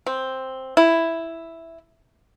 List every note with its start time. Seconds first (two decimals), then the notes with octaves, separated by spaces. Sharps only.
0.06 C4
0.77 E4